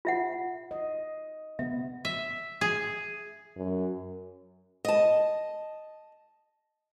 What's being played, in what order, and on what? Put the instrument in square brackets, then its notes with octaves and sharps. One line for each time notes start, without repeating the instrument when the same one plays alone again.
[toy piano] F4 E5 F#5
[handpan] D#5
[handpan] C3 B3 [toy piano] E5
[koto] E5
G#4
[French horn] F#2
[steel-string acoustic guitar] D#5 A5